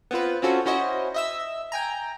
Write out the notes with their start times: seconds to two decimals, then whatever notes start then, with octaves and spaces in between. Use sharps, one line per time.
0.11 B3 C4 F4 B4
0.42 C4 C#4 F4 F#4 A4
0.66 C#4 E4 F#4 C5 D#5
1.14 D#5 E5 E6
1.72 G5 G#5 A#5